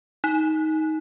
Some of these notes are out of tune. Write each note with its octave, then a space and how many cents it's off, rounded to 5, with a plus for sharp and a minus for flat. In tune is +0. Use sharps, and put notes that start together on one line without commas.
D#4 +15